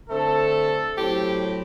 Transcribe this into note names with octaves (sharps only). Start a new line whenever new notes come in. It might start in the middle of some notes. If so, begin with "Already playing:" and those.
D3 A3 C4 A4
A2 F#3 C4 G4